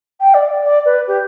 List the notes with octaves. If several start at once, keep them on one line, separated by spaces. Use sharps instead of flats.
G5
D5
D5
B4
G4